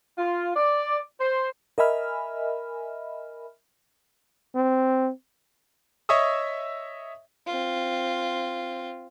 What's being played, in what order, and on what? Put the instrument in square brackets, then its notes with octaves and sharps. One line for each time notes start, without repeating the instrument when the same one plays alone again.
[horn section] F4
D5
C5
[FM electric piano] A#4 D#5 E5 G#5 B5 F6
[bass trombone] C4
[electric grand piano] C#5 D#5 E5 C#6 D#6 E6
[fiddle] C4 F4